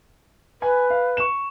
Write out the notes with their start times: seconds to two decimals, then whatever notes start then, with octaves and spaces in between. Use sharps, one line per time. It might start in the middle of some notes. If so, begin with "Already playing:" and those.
0.62 B4 G#5
0.90 F5
1.17 C#6 E7